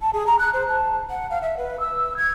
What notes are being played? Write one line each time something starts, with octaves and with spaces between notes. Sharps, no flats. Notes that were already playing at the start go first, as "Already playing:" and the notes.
A5
G#4
A#5
F#6
C5
A5
F#5
F5
E5
B4
E6
G#6